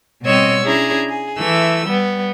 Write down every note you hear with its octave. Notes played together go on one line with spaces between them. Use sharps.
B2 G3 C4 C#5 D#5 E6
C#4 D4 E4 G#4 A#5
G#4
E3 A3 E6
G3 B3